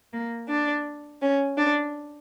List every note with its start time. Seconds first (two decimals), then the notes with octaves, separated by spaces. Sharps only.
0.13 A#3
0.48 D4
1.22 C#4
1.57 D4